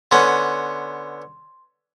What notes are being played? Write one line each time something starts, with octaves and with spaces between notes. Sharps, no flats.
D3 B3 C#4 C6